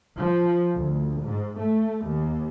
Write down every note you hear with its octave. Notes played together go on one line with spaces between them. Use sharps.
F3
D2
G#2
A3
D#2